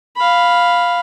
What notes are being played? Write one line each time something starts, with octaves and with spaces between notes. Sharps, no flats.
F5 B5